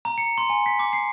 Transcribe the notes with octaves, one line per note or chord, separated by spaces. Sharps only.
A#5
C#7
C6
G#5
B6
D6
C7